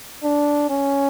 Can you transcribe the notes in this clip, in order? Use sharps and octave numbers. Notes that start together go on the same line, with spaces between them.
D4
C#4